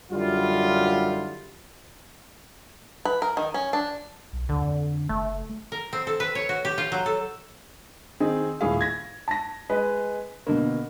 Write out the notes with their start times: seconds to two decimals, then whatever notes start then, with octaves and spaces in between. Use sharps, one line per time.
0.11 F#2 D3 G3 E4 F4
3.05 B4
3.22 A#4
3.37 D#3
3.54 C#4
3.73 D4
4.33 B1
4.49 D2 D3
4.61 F2
5.09 F#1 A3
5.72 A#4
5.93 C4
6.07 A4
6.20 B4
6.35 C#5
6.49 F#4
6.65 G4
6.78 F4
6.92 F#3
7.06 A4
8.20 D#3 C4 D#4 G#4
8.61 D#1 A2 G#4 F5
8.81 G#6 A#6
9.28 A5 A#6
9.69 G#3 B4 D#5
10.47 B2 D3 A#3